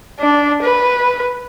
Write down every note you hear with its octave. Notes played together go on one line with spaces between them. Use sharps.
D4
B4